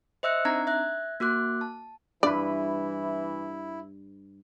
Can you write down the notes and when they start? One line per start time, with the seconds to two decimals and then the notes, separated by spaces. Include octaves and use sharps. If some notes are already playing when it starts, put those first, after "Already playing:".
0.23 C5 D#5 E5 E6 F#6 C#7
0.45 C4 D4 D#4 A#5 G#6
0.67 E5 F#6 G#6
1.20 A#3 F#4 D6 F#6
1.61 A5
2.23 G2 E3 E4 B4 D5